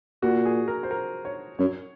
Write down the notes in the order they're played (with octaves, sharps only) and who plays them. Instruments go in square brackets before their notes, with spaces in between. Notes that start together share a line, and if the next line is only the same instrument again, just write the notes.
[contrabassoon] A#2 [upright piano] F#4
[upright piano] G#4
A#4
C5
A#4
C#5
[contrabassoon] F#2 [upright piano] C#5